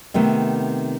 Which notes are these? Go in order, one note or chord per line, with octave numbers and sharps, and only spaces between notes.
C3 D#3 A3 B3